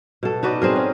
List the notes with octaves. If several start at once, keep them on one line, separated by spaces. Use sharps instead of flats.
B2 A4
D#4 F#4 B4 D5
C4 G#4 A#4
C#4